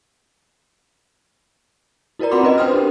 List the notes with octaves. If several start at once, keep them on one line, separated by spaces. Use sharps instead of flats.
E4 F#4 A#4 B4 D5 A#5
C4 F4 F#5 B5 C6 D6
C#4 B4 D#5
D4 C5 G5 C6 D#6 F6
G4 A#4